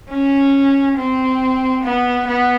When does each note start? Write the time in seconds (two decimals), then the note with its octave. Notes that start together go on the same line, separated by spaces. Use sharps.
0.10 C#4
0.97 C4
1.83 B3
2.27 B3